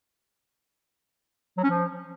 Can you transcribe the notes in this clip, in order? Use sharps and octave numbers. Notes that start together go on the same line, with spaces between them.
F#3
C#4
F3